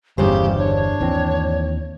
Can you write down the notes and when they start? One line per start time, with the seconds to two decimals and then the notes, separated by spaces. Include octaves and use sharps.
0.18 G1 E2 G2 C#3 G4 C5
0.58 D4 C#5
1.01 D#2 E3 C4